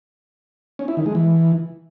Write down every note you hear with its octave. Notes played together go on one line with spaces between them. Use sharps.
C#4
E4
D#3
G#3
E3